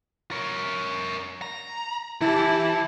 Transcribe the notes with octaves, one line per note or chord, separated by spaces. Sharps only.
A#4 C#5
A#5
E3 E4 G4 A5